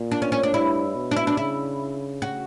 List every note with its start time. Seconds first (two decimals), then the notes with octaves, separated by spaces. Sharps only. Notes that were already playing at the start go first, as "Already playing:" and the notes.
Already playing: A#2
0.11 D4
0.22 C#4
0.32 C#4
0.43 D4
0.53 G2 E4
0.95 B2
1.11 D4
1.16 E4
1.27 D4
1.37 C#3 E4
2.22 F#4